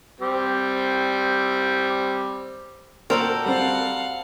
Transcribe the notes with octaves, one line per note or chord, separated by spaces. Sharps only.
G3 C4
A#2 F#4 A4 A#4 C5 D5 G5
G3 C4 F5 F#5